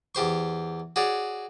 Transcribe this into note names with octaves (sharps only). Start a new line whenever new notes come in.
E2 G4 C5 C#6
F#4 G#4 C#5 D5